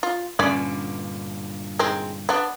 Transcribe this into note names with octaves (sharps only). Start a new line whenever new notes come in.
F4
G2 A#2 D3 C#4 D5
D#3 G#3 C4
B3 D4